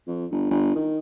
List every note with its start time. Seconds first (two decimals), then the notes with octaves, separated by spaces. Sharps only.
0.07 F2
0.31 G1
0.51 G1
0.75 D#3